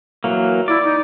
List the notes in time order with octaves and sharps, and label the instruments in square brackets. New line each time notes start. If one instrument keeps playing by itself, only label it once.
[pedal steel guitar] E3 F#3 A#3
[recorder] E4 [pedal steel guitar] D5
[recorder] D#4